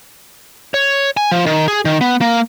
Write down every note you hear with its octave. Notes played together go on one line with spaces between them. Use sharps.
C#5
G#5
F3
D#3
G#4
D#3
B3
A#3